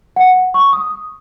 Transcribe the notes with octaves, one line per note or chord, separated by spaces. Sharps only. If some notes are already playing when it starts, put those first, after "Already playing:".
F#5
C#6
D#6